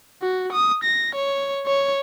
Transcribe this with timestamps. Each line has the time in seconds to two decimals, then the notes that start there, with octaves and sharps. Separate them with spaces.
0.22 F#4
0.53 D#6
0.83 A#6
1.15 C#5
1.66 C#5